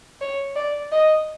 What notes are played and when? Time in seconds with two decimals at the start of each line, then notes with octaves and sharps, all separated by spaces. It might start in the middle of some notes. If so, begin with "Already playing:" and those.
0.21 C#5
0.56 D5
0.92 D#5